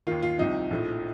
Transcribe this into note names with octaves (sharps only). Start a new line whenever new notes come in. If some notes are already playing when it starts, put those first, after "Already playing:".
D#2 D#3 F4
F4
C2 C3 F3 D#4
A#1 A2 F3